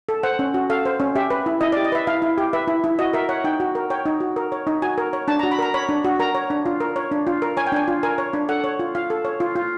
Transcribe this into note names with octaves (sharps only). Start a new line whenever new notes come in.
A4
C5 F#5
C#4
F#4
A4 F5
C5
C#4
G4 E5
B4
E4
E4 D#5
D5
G4
D#5
B4 E5
E4 F5
E4
G4
B4 E5
E4
E4
F#4 D#5
A#4 E5
C#5 F#5
D#4 G5
F#4
A#4
C#5 G5
D#4
F#4
A#4
C#5
D#4
F#4 G#5
A#4
C#5
D4 A5
A#5
F#4
B5
A#4 A#5
C#5 B5
D4
F#4
A#4 A#5
C#5
D4
F4
A#4
C#5
D4
F4
A#4
C#5 G#5
G5
D4 G#5
F4
A#4 G#5
C#5
D4
A4 F#5
C#5
F4
F4 F5
A4
C#5
F4
F4